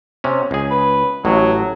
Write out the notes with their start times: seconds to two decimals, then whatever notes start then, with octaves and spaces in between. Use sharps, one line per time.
0.24 C3 C#4
0.51 C#2 G#4
0.71 B4
1.25 A1 A2 F#3